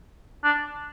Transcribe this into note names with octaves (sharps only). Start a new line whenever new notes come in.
D4